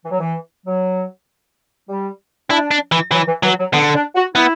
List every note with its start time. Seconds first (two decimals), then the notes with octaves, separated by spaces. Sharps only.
0.05 E3
0.11 F#3
0.20 E3
0.66 F#3
1.89 G3
2.50 D4 E4
2.71 D4
2.92 E3
3.11 E3 F#3
3.27 E3
3.43 E3 F#3
3.59 F#3
3.73 D3 B3
3.94 D4
4.15 F#4
4.35 B3 E4